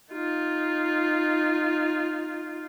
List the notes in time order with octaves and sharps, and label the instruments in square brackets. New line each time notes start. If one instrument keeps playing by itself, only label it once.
[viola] D#4 F4